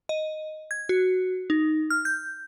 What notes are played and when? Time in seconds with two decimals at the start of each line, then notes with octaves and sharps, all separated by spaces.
0.09 D#5
0.71 G#6
0.89 F#4
1.50 D#4
1.90 F6
2.05 G6